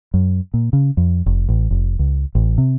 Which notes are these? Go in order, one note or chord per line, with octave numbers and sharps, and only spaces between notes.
F#2
A#2
C#3
F2
F1
A1
F1
C#2
A1
C3